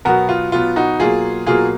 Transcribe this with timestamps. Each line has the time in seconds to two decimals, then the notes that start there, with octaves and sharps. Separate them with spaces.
0.05 B2 F#3 B3 F#4 A#4
0.29 F4
0.52 B2 F#3 B3 F4
0.76 D#4 F#4
1.00 B2 F#3 A#3 F4 G#4
1.47 B2 F#3 A#3 F4 G#4